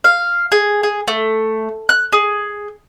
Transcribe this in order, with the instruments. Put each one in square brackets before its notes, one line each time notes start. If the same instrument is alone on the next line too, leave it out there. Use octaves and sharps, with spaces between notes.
[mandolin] F5
G#4
G#4
A3
F#6
G#4